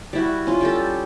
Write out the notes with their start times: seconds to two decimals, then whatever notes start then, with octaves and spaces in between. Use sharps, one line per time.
0.13 G3 E4 F#4
0.47 C#4 F4
0.61 G3 G4 A4